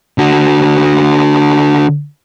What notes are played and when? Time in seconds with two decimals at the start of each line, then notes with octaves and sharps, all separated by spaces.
0.18 D3 F#4